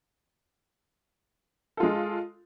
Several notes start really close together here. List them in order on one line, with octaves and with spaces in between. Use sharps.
A4 F4 G#3